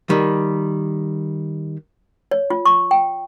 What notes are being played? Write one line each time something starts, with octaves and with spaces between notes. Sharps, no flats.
D#3 G3
C#5
F4
C#6
G5